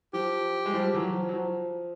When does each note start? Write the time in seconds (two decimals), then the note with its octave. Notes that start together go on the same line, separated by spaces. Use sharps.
0.13 F3 G4
0.65 G#3
0.74 F3 G3
0.94 E3 F#3
1.13 F3
1.29 F#3
1.34 F3